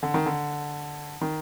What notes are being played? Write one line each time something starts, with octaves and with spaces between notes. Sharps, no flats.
D3
D#3
D3
D#3